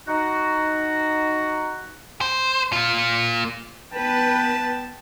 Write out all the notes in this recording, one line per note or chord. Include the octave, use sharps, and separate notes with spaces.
D#4 F#4
C5
A#3 F4
B3 B4 G5 A5